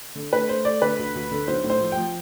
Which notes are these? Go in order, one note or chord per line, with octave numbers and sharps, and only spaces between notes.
D3
A3 B4
A3 C5
A3 D5
D3 B4
D2
D2
D3
B1 C5
A2
C5
F3
G5
F3